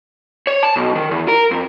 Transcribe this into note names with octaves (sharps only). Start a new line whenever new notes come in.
C#5
A5
B1
D#3
E2
A#4
F2